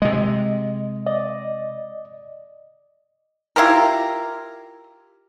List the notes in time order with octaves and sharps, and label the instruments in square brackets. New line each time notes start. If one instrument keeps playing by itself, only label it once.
[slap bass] C3 G#3 [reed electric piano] D#5
[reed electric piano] D5 D#5
[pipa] E4 F4 G4 A#4